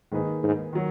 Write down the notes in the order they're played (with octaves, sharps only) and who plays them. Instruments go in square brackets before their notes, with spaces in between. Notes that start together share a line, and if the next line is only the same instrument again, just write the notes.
[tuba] G#2 [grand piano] D#3 A#3 D#4 G#4 B4
[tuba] G#2
[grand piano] D#3 F#3